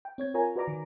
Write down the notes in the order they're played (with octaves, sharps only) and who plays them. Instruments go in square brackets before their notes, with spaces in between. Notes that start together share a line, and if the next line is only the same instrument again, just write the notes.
[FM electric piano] G5
C4 C#5 G#6
F4 A#4 C#5 G#5 A#5
F#4 B4 D5 A#5 D6
D#3